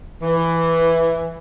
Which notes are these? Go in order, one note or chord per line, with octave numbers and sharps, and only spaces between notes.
E3